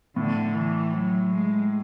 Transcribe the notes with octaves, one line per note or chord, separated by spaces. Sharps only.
A2 D3
E3
F#3
G#3